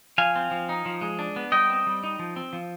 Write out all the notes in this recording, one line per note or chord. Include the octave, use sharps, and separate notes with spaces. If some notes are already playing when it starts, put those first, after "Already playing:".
F3 F5 G#5
C4
F3
D#4
F3
G#3
D4
B3
G3 D#5 G5
C4
G3
D#4
F3
C4
F3